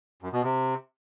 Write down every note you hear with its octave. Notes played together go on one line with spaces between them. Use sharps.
F#2
B2
C3